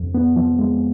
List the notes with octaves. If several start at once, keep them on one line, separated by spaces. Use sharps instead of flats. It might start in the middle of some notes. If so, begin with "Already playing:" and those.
Already playing: F2
B3
F3
G#3